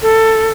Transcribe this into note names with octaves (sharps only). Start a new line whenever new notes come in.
A4